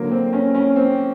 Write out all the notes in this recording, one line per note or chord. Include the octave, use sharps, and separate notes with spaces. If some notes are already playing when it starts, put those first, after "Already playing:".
Already playing: D3 F#3 A#3
C4
C#4
C#4
C4